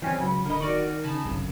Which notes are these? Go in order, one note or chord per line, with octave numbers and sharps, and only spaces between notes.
E3 G3 C4 C#4 G#5
C#2 C#3 F#3 B5
D1 D3 A#4 D#5 B5
D#3 F#4 A#4 D5 C#6
C#3 D#4 G#5 A5 B5
G1 C2 F#2 C#3